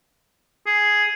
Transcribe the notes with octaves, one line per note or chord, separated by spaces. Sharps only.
G#4